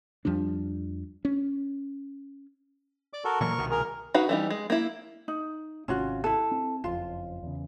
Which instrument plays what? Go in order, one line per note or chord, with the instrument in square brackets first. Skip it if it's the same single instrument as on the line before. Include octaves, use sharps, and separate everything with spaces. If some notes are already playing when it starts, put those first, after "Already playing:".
[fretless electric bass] F2 F3 G3 D4
C#4
[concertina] D5 D6
F#4 A4 A#4
[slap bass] A#2 E3 F#3 [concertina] A#4 C#6
[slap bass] C2 B2 D#3
[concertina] G#4 [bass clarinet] A#4
[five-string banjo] D#4 F#4 B4 F5
E3 G3 D#4
G#3
A#3 E4
[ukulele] D#4
[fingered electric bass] G#1 C3 D#3 [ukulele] C#4 F4 F#4
[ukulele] E4 A4
[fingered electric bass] C4
[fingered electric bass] F#1 F2 [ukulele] F4
[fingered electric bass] E2 C#3